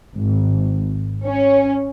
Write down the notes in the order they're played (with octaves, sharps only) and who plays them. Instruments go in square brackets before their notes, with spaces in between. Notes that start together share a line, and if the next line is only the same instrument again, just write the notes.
[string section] G#1
C#4